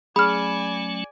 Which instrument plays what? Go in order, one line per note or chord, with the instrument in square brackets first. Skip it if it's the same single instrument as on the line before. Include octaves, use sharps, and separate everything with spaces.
[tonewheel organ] F#3 A3 C#4 [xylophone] G#4 F6 [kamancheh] D5 G#5 [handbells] B5